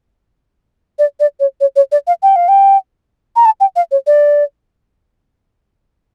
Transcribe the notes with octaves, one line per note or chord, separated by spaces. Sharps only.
D5
D5
C#5
C#5
C#5
D5
F5
G5
F5
G5
A#5
A5
G5
F5
C#5
D5